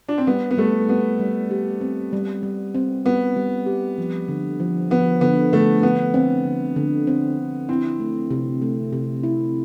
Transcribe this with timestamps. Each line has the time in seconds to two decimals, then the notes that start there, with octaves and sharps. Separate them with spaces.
0.09 D4
0.18 C4
0.27 G3 B3
0.51 B3
0.58 G3 A3
0.89 G3 B3
1.20 G3
1.51 G4
1.81 C4
2.13 G3
2.43 G3
2.75 C4
3.05 G3 B3
3.36 G3
3.66 G4
3.98 F3
4.28 D3
4.60 F3
4.91 F3 B3
5.21 D3 B3
5.53 D3 A3
5.83 D3 B3
6.14 C4
6.45 D3
6.76 D3
7.07 C4
7.37 D3
7.69 C4 E4
8.00 A3
8.31 C3
8.62 A3
8.92 C3
9.23 E4